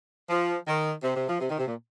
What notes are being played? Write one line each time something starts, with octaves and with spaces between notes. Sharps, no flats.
F3
D#3
C3
C3
F3
C3
D#3
C3
A#2